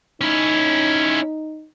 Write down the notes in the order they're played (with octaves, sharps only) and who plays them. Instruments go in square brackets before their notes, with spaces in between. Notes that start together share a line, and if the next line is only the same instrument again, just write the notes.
[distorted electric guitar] C#4 E4 [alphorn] D#4